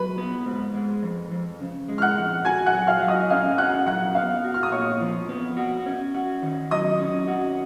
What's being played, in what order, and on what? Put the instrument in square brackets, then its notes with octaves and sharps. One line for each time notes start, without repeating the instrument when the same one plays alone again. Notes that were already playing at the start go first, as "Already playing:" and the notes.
Already playing: [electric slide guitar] F#3 [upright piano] B4 B5
[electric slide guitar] B3
G#2
G#3
F2
F2
C#3
G#3
[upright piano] F6
F#5 F#6
[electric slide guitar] F2
[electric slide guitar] F#4 [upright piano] G#5 G#6
[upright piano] F#5 F#6
[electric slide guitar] F#3
[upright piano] F5 F6
[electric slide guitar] F#3
[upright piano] D#5 D#6
[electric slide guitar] C#4 [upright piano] F5 F6
[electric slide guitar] F#4 [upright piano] F#5 F#6
[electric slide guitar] F#3 [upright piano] F#5 F#6
[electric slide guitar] B3 [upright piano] F5 F6
[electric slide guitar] F#4
[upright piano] F6
D#6
[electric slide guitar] A#2 [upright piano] C#5 C#6
[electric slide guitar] F3
B3
F#4
C#4
F#4
D#3
[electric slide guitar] F#3 [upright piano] D#5 D#6
[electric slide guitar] C#4
F#4